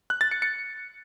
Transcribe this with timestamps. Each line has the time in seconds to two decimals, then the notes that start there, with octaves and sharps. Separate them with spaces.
0.10 F#6
0.21 A6
0.31 C#7
0.42 C#7